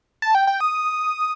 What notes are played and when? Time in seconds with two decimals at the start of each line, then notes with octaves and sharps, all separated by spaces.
0.22 A5
0.35 G5
0.47 G5
0.60 D#6